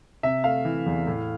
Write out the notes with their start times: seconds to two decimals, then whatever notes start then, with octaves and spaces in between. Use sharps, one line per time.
0.23 C3 E5
0.44 A3 F5
0.65 E3
0.86 E2
1.07 A2